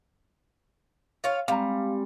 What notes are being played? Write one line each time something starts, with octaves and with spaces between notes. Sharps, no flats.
F4 C#5 F5
G3 G#3 C4 F5 A#5